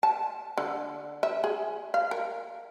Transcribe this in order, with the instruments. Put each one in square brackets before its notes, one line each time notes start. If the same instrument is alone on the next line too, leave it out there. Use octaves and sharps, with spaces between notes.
[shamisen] A5
D3
E5
G#4
F5
A#4